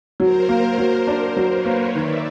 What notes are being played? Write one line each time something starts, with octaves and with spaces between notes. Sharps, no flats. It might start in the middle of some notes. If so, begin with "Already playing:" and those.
F#3 A#4 C5
A#3
F#3
D4 A#4 C5
F#3
B4 C#5
A#3
D#3 D5 E5